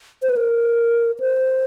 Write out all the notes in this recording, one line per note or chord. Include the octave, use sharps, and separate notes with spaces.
C5
B4
A#4
C5